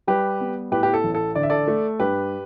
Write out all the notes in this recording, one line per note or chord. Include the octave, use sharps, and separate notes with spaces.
G3 G4 B4
B3
A2 G4 B4
G4
A4
A1
A4
D3 D5
E5
A4 D5
A3
G2 G4 B4